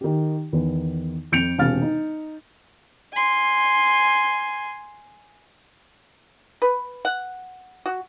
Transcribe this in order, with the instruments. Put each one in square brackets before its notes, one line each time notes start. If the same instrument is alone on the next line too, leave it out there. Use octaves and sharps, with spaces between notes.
[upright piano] D#3 G4
E2 D#3
F2 G6 C#7 D7 F7
E1 C3 F5 F6 A6
D#4
[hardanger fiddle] G#5 C6
[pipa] B4
F#5
F#4